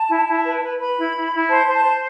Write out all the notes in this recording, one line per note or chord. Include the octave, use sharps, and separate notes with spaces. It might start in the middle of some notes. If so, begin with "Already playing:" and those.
Already playing: A5
E4
E4
B4
B4
B4 B5
E4
E4
E4
C5 A5
C5
A5
C5